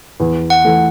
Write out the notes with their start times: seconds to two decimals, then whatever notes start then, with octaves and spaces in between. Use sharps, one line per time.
0.20 E2
0.50 F#5
0.64 E3 A3